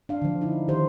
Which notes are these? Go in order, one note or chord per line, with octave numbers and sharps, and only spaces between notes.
D4 F5
D3 F3
D#4 E4
D#3 G4 C5